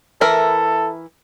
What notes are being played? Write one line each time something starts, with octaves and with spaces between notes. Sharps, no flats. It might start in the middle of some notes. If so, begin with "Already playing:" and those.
E3 E4 A4 A#4